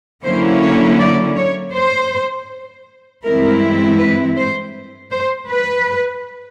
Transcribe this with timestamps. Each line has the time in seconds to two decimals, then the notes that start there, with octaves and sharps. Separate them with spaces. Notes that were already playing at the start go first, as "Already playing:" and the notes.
0.24 D3 F#3 A#3 C#4 E4 C5
0.62 C#5
0.99 D5
1.37 C#5
1.74 C5
3.25 G2 E3 G#3 C4 E4 A#4
4.00 B4
4.37 C5
5.12 C5
5.50 B4